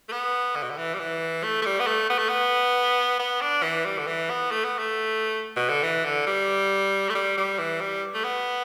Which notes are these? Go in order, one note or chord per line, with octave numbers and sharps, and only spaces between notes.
A3
B3
D3
B2
D3
E3
G3
E3
A3
A3
G3
B3
A3
B3
A3
B3
B3
D4
E3
G3
D3
E3
B3
A3
B3
A3
B2
D3
E3
D3
G3
A3
G3
G3
E3
G3
A3
B3